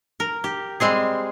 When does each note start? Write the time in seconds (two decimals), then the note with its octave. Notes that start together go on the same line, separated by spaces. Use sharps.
0.20 A#4
0.44 G4
0.80 G3 G#3 C4 G#4